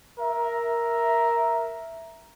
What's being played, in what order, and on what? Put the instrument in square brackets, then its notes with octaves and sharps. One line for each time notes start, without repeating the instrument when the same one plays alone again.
[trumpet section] A#4 E5